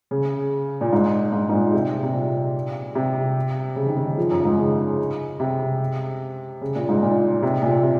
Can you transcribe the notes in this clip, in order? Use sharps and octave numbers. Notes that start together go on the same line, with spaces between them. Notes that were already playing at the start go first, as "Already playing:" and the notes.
C#3
A#2
G#2
G#2
G#2
A#2
C3
C3
A#2
C3
C#3
D#3
C#3
D#3
F3
F#2
G#2
C#3
C3
C#3
A#2
G#2
A#2
C3
A#2
C3